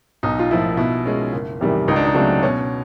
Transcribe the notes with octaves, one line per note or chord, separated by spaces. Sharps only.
B1 D#4
F4
A2 F3 A#3 E4
B2 E4
G#3 C#4
F#1
E2 C3 D#3 G3
C#2 D#4
D4
D#4
C#3 F#3 A3 C4 D4
B2 C#4